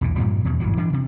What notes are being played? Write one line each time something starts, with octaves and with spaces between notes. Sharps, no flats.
B1 E2 A#2
G2 A#2 F3 G3
E2 B2 D#3
G#1 G2 E3 F#3
E3 D4
C3